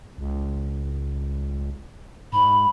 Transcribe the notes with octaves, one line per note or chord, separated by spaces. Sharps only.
C#2
G#2 B5